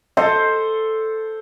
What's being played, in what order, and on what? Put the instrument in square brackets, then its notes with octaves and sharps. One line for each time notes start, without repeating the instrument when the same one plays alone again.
[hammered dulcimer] A4 C5 [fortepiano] D#5